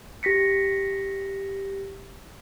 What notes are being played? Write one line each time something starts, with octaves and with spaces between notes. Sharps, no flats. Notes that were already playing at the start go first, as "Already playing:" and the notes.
G4 A#6 B6 C#7